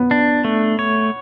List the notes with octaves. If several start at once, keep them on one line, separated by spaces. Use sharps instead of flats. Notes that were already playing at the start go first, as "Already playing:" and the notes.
Already playing: B3
D4
A3
C#5